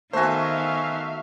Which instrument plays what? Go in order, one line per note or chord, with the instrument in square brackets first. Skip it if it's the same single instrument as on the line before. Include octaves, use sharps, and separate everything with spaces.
[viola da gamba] D#3 B3 [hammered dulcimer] A3 F#4 [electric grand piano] C5 G#5 [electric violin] E5 F5